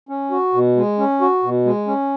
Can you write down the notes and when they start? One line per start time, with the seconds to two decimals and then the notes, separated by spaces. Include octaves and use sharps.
0.09 C#4
0.31 F#4
0.53 B2
0.76 G#3
0.98 C#4
1.21 F#4
1.43 B2
1.65 G#3
1.87 C#4